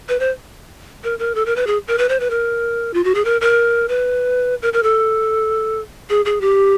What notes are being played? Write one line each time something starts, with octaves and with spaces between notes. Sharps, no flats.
B4
C5
A#4
A#4
A4
A#4
B4
G#4
A#4
B4
C5
B4
A#4
F4
F#4
G#4
A#4
A#4
B4
A#4
A#4
A4
G#4
G#4
G4